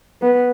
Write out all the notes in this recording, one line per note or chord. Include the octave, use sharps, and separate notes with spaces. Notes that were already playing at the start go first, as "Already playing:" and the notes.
B3